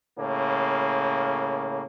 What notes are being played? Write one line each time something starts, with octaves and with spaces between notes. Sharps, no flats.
A2 C#3 A#3